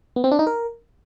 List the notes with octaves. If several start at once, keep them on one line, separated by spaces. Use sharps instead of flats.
B3
C4
D4
D#4
A#4